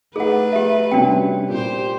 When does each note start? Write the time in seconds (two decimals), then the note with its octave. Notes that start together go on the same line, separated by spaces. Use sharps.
0.16 A3 D#4 G#4 B4 F#5
0.52 G4 E5
0.91 C3 G3 C#4 D4 F#4 G5
1.49 A#2 G4 C5